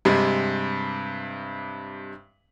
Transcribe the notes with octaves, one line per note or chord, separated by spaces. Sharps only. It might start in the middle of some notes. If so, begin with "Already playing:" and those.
G2 C3 G#3